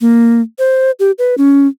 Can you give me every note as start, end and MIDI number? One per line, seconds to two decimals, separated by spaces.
0.01 0.41 58
0.59 0.91 72
0.99 1.11 67
1.18 1.35 71
1.38 1.67 61